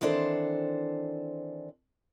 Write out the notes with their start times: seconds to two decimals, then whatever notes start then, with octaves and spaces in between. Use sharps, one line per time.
0.01 D#3 E3 C4 D4 A4 C5